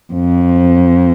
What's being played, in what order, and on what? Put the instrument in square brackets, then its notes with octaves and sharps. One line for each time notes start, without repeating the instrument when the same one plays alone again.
[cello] F2